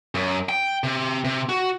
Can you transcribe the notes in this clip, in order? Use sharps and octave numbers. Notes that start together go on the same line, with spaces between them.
F#2
G5
C3
C3
F#4